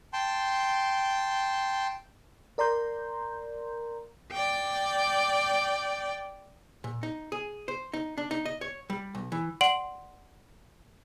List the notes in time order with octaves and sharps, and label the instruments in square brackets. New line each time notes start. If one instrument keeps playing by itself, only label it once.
[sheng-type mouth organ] G5 A5 C6
[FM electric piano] A#4 D5 A#5 C6 G6
[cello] D5 G5
[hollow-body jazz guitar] A#2
D#4
G#4
C5
D#4
D4
D#4
D#5
C#5
G3
B1
E3
[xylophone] D5 F#5 C6 D7 F#7